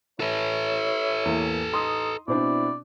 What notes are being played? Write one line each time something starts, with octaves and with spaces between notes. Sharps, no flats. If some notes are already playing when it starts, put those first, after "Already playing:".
E4 A4 B4 C#5
E2 A#3
D#4 C6 D#6
B2 C4 D4 E4 D5